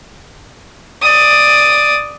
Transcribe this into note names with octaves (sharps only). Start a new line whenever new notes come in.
D5 D#6